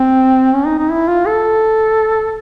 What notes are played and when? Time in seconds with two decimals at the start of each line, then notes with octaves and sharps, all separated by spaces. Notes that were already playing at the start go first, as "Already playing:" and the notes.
Already playing: C4
0.54 C#4
0.66 D#4
0.79 D#4
0.90 E4
1.08 F4
1.27 A4